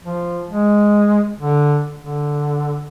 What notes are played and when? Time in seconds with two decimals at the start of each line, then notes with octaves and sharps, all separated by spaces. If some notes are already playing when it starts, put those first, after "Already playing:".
0.03 F3
0.48 G#3
1.40 D3
2.01 D3